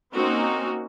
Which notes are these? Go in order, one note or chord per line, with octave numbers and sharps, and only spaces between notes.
A#3 C4 C#4 D#4 F#4